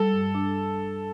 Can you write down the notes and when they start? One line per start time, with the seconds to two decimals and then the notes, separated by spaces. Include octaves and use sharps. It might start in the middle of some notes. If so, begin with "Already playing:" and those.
Already playing: G3 A4
0.12 G2
0.35 D4